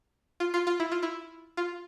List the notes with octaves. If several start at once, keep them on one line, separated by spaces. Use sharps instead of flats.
F4
F4
F4
E4
F4
E4
F4